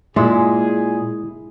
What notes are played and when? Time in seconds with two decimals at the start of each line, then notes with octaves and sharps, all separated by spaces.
0.16 A#2 G#3 E4 G#4